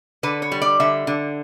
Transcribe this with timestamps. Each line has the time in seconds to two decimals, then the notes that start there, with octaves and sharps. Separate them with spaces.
0.23 D3 B4
0.42 C#5
0.52 G3
0.62 D5
0.80 D3 E5
1.07 D3